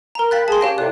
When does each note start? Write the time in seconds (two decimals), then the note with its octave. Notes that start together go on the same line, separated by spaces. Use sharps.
0.15 A#4 A#5
0.31 F5 G5 B5 F#6 A6 B6
0.48 G#4 A5 C6
0.61 C#4 G4 F5 G5 A#6
0.78 A2 C3 D5 F#6